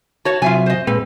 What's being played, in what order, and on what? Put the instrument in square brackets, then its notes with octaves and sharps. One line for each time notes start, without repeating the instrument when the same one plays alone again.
[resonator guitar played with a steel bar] F#4 C#5 [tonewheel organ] A5
[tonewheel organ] C3 F#3 [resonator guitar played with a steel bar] F4 E5 G#5
[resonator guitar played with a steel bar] C5 D#5
[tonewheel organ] A#2 G#3 B4 [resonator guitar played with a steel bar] C4